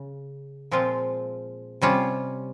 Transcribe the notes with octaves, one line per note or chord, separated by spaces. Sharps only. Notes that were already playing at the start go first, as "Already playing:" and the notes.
Already playing: C#3
A#2 F3 G#3 C4 F4
C3 G3 C#4 F4